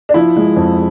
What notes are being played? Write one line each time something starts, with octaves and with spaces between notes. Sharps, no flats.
D4
F3 E4
G#3
F2